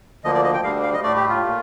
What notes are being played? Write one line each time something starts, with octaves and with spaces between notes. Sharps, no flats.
D2 D3 F3 A#3 D#5
D5
D#5
G5
D2 D3 G3 F5
F5
D#5
A2 A3 D5
G4
F4
A#2 A3